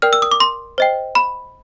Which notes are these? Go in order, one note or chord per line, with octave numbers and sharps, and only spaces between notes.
A#4 D5 G5 F6
E6
D#6
D6
C6
C5 D#5 G5
B5